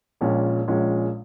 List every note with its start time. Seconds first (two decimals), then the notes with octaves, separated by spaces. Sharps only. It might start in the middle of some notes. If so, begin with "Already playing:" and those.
0.21 A#1 A#2 G#3 C#4
0.68 A#1 A#2 G#3 C#4